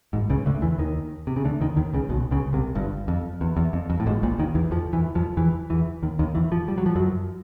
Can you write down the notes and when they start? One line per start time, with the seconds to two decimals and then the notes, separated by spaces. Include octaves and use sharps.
0.13 G#1 G#2
0.30 C#2 C#3
0.46 D2 D3
0.62 E2 E3
0.78 D#2 D#3
1.27 C3
1.36 C#3
1.45 D2 D3
1.61 D#2 D#3
1.76 D#2 D#3
1.93 C#2 C#3
2.09 B1 B2
2.31 C#2 C#3
2.53 C2 C3
2.75 G1 G2
3.08 F2
3.41 E2
3.57 E2
3.73 F2
3.90 F2
4.00 A2
4.06 G#1 G#2
4.23 A#1 A#2
4.39 D#2 D#3
4.55 E2 E3
4.71 F2 F3
4.93 E2 E3
5.15 F2 F3
5.37 E2 E3
5.70 E2 E3
6.02 D#2 D#3
6.19 D#2 D#3
6.35 E2 E3
6.52 F2 F3
6.68 G3
6.78 F#3
6.86 F3
6.96 F#2 F#3